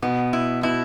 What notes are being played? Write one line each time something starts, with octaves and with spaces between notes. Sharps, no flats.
B2 B3
E4
B2 E4